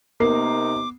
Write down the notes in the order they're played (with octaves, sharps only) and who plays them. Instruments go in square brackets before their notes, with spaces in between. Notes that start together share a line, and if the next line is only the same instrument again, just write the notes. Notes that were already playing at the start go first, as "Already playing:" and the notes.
[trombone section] C3 D#4 [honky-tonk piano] A#3 [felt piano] B3 C7 [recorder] D6